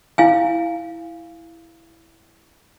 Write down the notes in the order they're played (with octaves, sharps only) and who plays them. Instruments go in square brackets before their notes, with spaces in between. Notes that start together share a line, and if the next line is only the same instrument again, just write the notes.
[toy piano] E4 F5 G#5